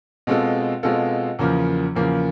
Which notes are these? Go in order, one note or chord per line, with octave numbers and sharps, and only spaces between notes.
B2 G#3 C4 F4 A4
B2 G#3 C4 F4 A4
E2 C#3 F3 A#3
E2 C#3 F3 A#3